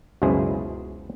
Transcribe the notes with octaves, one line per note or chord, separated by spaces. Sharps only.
C#2 F#2 B2 E4 G#4 C5